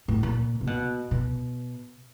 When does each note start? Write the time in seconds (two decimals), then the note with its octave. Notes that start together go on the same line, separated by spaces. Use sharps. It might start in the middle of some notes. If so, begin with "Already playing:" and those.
0.08 A2
0.23 A#2
0.61 C3
0.67 B2
1.11 B2